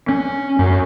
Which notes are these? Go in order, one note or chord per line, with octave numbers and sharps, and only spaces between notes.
C#4
F#2